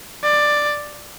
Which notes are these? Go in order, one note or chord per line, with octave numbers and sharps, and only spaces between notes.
D5